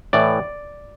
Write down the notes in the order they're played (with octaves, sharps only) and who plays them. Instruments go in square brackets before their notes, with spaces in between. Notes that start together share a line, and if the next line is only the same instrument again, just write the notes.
[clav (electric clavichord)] A2 E3 D5